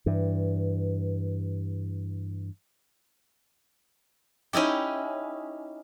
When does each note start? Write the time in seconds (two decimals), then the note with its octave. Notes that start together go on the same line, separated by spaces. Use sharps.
0.06 G2 E3
4.53 C#4 D#4 E4 G4